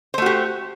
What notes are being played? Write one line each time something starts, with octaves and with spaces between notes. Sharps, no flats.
A3 F#4 G4 C5